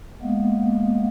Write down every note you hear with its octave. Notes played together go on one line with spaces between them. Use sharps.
G#3 A#3 B3